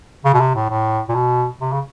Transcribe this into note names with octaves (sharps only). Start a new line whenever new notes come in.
C#3
B2
C3
A2
A2
A#2
B2
C3
C#3